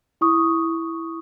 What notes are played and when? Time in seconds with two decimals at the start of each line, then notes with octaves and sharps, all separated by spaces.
0.21 E4 C#6 D#6